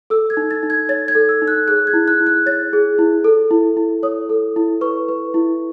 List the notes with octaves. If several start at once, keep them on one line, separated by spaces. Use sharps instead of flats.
A4 E6
G#6
D#4
A6
D#4
G#6
C#5 A6
G#6
A4
E6
D#4
F#6
G#4 F#6
G#6
E4
F#6
E4
F#6
C#5 A6
G#4
E4
A4
E4
E4
C#5 D#6
A4
E4
B4 C#6
B4
E4